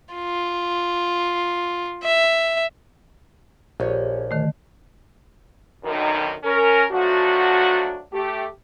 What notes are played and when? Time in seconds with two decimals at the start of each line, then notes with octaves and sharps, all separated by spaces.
0.14 F4
2.03 E5
3.80 A#1 C#4 G4 G#4
4.31 D3 D#3 A3
5.84 B1 F#2 B2 D3 D#3
6.44 C#4 A#4
6.91 F3 F#3 A3 D4 F#4
8.13 A3 G4